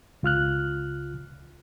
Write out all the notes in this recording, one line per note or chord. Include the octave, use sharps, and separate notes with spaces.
C#2 F4 F6 F#6